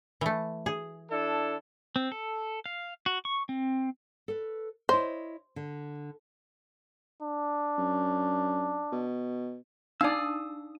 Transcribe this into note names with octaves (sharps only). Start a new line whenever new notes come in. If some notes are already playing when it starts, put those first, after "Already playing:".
E3 A3
G#4
D4 E4 A4
C4
A4
F5
F#4
C#6
C4
A4 B4
E4 C5 C#5 D#5
D3
D4
F#2
B2
D4 D#4 D5 F5 A5 D#6 E6